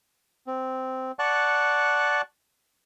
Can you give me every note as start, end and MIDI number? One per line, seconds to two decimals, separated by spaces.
0.47 1.12 60
1.19 2.22 74
1.19 2.22 78
1.19 2.22 81
1.19 2.22 85
1.19 2.22 90